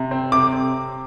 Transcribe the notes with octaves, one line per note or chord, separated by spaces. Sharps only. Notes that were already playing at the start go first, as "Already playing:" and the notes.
Already playing: C3
C4
C3 D6
C4